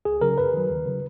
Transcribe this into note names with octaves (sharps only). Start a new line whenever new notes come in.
C#2 G#4
C#3 F#3 A#4
F#2 B4
D#3 F#3
D#2
C#3 F#3